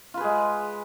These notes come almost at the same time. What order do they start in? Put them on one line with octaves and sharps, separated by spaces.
F4 B4 G#4 G#3